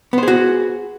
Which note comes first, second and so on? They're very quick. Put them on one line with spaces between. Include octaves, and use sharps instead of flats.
B3 C5 G#4 F#4